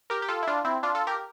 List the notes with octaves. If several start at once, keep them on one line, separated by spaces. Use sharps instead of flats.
G4 A#4
G4
F4 A4
E4
D4 F4
C4 E4
D4 F4
F4 A4
G4 A#4